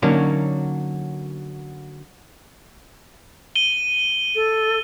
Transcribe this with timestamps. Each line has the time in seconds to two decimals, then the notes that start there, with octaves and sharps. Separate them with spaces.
0.02 D3 F#3 A#3 C#4 D#4
3.55 D#7 G7
4.35 A4